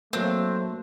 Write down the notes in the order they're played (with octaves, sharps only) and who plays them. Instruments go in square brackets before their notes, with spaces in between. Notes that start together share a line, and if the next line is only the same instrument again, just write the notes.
[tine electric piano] F#3 A#3 [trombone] A3 [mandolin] C4 D4